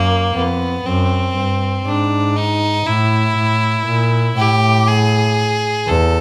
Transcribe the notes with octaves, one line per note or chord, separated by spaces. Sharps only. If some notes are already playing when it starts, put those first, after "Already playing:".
Already playing: F#2 A#3
F2 B3
F#2 C4
G2
G#2 D4
D#4
A2 E4
A2
A#2
A2 G4
G#4
E2 A4